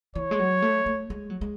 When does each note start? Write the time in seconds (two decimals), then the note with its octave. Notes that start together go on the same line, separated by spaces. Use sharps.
0.15 E3 C#5
0.31 G#3
0.39 F#3
0.62 A3
0.86 A3
1.10 G#3
1.30 F#3
1.41 G#3